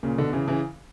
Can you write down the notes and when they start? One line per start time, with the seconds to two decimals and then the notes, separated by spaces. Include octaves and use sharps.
0.03 A#2 C#3
0.18 B2 D3
0.33 C#3 E3
0.48 C#3 E3